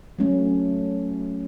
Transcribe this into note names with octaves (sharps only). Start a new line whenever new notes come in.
F#3 A3 C#4